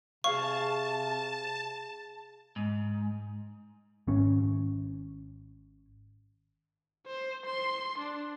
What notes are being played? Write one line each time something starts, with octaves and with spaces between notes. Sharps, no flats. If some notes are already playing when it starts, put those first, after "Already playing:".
C3 G#4 F5 A5 C#6
G#2
G#1 C#4
C5
C6
D4